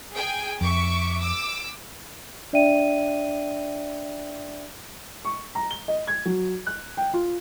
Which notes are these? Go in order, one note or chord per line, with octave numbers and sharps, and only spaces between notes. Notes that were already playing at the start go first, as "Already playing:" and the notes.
G#4 G5 G#5
F2 E5 C#6 D6
D6 E6
D4 D5 E5 G5 D#7
C#6
A#5
G7
D#5
G#6
F#3
F#6
G5
F4